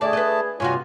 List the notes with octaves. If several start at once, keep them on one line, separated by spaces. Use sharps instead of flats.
D2 A3 G#4 D5 A5
B4 D#5
G2 C3 F4 F#4 C#5 G#5